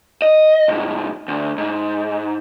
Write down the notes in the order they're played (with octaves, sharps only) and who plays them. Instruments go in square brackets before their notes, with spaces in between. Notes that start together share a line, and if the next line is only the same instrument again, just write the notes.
[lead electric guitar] D#5
C2 G#2
D2
G#2